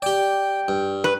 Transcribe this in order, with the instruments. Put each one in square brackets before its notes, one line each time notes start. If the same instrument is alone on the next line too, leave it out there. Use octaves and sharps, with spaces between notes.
[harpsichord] G4 D5 [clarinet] G5
[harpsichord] G2
[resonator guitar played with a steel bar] B4